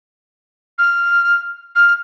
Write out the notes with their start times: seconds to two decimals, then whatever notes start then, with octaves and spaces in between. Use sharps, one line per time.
0.78 F6
1.75 F6